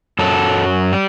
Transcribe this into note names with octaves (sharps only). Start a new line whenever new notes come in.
F#2 F#3 A4
G3